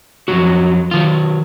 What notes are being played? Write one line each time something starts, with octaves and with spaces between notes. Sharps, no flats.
F2 D#3 F#3 F#4
D#3 F#3 F4